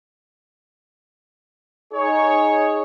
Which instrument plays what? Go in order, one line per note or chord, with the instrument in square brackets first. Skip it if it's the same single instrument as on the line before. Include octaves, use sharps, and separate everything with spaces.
[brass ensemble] D#4 G#4 C#5